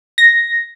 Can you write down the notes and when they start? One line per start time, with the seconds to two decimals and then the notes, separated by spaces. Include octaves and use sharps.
0.18 A#6